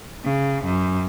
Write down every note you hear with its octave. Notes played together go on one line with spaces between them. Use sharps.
C#3
F#2